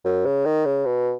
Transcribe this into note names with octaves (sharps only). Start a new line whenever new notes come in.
F#2
C#3
D#3
C#3
B2